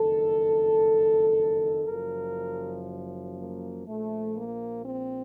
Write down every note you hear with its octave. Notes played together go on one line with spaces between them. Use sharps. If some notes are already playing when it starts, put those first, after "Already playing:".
Already playing: F#1 F2 D#3 A4
F#1 F#2 F3 A#4
A#3
A#1 A#2 F3 A3
A#3
C4